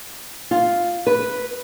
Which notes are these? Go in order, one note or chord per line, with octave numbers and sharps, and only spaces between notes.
F4
B4